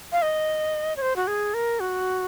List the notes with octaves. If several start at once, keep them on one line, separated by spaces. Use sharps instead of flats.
F5
D#5
C#5
C5
F#4
G#4
A#4
F#4